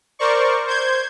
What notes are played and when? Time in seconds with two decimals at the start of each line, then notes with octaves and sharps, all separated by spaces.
0.19 A#4 C5 D5 C#6
0.67 C5 G6 G#6